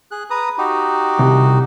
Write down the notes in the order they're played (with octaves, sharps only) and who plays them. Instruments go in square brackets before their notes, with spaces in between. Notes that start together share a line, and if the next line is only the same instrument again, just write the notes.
[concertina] G#4 F#6
B4 A#5 D#6
D#4 F#4 G4
[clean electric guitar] C2